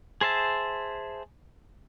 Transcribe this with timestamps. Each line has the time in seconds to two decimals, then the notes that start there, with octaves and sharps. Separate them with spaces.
0.21 G#4 C5 E5 A5